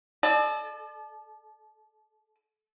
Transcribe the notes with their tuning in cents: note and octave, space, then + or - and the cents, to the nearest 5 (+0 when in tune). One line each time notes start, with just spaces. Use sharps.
A4 -30 D5 +35